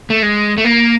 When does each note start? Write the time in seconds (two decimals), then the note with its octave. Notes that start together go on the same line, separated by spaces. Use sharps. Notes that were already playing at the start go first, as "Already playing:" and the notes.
0.10 A3
0.23 G#3
0.58 A3
0.65 A#3